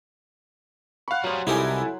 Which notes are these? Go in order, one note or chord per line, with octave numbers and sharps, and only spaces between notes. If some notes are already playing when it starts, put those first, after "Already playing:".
F5 F#5 B5 C#6
F#3 G3 G#4 C5
C2 D#4 E4 G4 A4 A#4 G#5